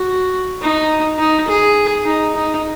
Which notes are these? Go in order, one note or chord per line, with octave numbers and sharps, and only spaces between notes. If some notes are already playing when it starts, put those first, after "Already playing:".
Already playing: F#4
D#4
D#4
G#4
D#4
D#4